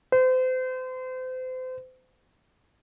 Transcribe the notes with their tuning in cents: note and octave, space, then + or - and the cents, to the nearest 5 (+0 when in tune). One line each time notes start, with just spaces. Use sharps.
C5 -35